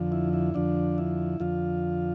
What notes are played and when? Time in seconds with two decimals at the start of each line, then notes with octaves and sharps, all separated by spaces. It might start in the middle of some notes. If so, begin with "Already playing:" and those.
Already playing: F2 D3 F3
0.12 E4
0.33 E4
0.54 F2 D3 F3 D4
0.98 E4
1.40 F2 D3 F3 F4